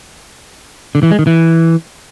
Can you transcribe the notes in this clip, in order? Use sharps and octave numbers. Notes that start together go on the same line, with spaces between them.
D3
E3
G#3
D#3
E3